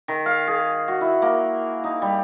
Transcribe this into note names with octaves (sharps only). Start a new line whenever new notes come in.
D#3
F5
G#4
F#4
E4
A#3
D#4
G3